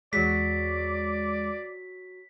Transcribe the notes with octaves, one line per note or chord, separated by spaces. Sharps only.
E2 F#3 G#3 D5 B6